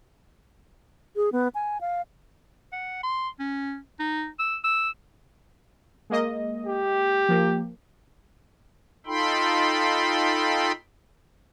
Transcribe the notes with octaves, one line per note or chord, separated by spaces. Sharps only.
G#4
B3
G#5
F5
F#5
C6
C#4
D#4
E6
E6
G#3 A#3 D#5
G4
F3 A#3
D#4 F4 A4 G5 B5 C6